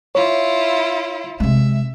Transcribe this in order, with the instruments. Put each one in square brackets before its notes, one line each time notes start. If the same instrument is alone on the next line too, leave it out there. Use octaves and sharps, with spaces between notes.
[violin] E4 F4 [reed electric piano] C#5
[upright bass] C3 G#3 [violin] E5